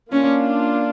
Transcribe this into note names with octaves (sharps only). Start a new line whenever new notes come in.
A#3 C#4 D4 F4